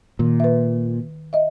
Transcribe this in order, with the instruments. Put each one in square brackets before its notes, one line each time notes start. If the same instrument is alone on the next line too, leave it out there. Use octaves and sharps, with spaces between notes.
[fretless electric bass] A#2 [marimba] D#3
[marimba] B4 E5
D#5 E5